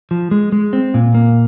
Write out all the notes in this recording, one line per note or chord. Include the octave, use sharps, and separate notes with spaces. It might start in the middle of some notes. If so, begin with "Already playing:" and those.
F3
G#3
G#3
C4
A#2
A#3